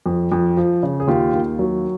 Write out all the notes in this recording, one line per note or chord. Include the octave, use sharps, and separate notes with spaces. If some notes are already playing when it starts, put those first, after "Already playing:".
F2
F2
F3
C#3
G#4
D#2 F4 G4
D#2
F#3